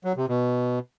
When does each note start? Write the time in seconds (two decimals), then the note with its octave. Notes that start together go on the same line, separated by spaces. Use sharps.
0.05 F#3
0.16 C3
0.28 B2